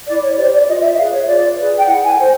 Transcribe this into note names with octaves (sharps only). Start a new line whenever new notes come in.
E4 D5
C#5
G4 C5 D5
D5
F4 D#5
E5
G#4 B4 F5
C#5
F4 D5
G#4 B4
G5
E4 F#5
G#5
A4 C5